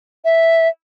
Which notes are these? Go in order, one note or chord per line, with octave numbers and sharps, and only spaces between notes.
E5